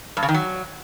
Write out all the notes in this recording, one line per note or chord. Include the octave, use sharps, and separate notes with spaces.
G2
C#3
D#3
F#3